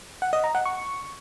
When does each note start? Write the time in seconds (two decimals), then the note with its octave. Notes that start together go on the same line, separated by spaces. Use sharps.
0.22 F#5
0.33 D#5
0.44 A#5
0.55 F#5
0.66 C#6